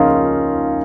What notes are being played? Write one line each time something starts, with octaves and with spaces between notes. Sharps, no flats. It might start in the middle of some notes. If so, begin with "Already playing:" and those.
Already playing: C#2 C#3 F3 A#3 C#4 D#4 F4